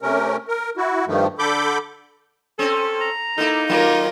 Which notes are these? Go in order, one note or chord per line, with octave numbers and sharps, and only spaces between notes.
C3 A3 C#4 A#4
A#4
E4 F#4
G2 D#3 F3 A3
D3 A4 B5 D6 G6
C4 C#4 A4
A#5
A#3 D#4 E4 A4
D#3 F#3 A#3 F4 A#4